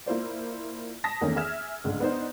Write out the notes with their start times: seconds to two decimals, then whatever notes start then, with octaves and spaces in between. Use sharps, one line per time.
0.06 A#3 E4 F4 C5 D5
1.04 A5 D#6 A#6 B6
1.21 E2 D#3 A3 A#3 C#4
1.36 G#4 E5 E6 F6 G#6 E7
1.84 C#2 G#2 D3 A3
2.00 B3 D4 D#4 C5